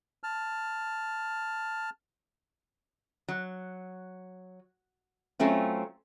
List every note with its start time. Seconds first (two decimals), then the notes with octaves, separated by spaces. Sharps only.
0.23 A5 F6
3.28 F#3
5.40 F#3 A3 C4 C#4 F4